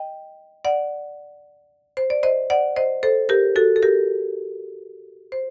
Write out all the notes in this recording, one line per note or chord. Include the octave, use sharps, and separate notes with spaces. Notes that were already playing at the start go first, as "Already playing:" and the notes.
Already playing: D#5 G5
D5 F#5
C5
D5
C5 D#5
D5 F#5
C5 D#5
A4 C5
G4 A#4
F#4 A4
A4
G4 A#4
C5